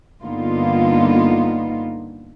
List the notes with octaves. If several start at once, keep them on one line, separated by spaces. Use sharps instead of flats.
G2 D3 A#3 B3 D#4 F4